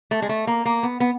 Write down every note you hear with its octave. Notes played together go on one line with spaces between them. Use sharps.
A3
G#3
A3
A#3
A#3
B3
B3